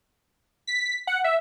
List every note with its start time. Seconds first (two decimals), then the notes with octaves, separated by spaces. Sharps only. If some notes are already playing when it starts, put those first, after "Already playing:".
0.67 B6
1.07 F#5
1.24 E5